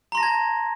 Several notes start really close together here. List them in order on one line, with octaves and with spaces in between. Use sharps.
A#5 C6 A#6 A5 G#6